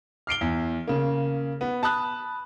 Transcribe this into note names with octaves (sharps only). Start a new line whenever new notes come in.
F6 C7 D7 G7
E2
C#3 A#3
B3
A5 B5 D#6 F#6